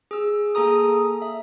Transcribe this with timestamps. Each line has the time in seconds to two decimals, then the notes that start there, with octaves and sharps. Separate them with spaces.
0.11 G#4 E6
0.55 A#3 G#4 A4 A#5 D#6
1.22 E5